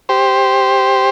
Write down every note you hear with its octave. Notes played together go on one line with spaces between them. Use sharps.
G4 C5